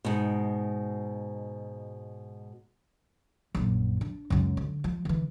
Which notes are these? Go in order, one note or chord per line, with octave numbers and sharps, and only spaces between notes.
G#2 B2
A#1 F#2
D4
C#2 F#2
D3
F3
D3 E3